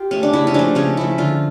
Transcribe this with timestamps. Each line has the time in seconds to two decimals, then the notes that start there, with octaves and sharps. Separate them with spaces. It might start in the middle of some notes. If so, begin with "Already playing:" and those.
Already playing: F4 G4
0.11 A3 C#4
0.23 D4
0.33 C#3 E4
0.47 C#4
0.54 F3 A3 D4
0.75 C#3 C#4
0.97 F3 A3 E4
1.18 D3 F4